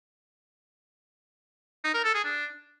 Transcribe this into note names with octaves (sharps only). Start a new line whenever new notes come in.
D#4
A#4
A4
G#4
D4